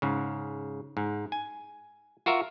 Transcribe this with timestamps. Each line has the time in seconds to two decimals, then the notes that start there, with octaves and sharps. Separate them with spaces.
0.02 G#2 C#3
0.97 G#2
1.32 G#5
2.26 F4 F#4 A#4 E5